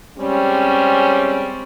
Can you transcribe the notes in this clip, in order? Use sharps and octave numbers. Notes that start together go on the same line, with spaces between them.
G3 G#3 C4 C#4